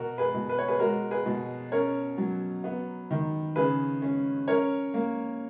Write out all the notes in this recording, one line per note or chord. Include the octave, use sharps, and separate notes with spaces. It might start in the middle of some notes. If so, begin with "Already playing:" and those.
Already playing: B2 F#4 A#4
G#4 B4
B2
B4
C#5
G#4 B4
G#3 F#4 A#4
G#4 B4
B2
C#4 A#4 C#5
F#3
B3
D#3
C#3 G#4 B4
C#4
C#4 A#4 C#5
A#3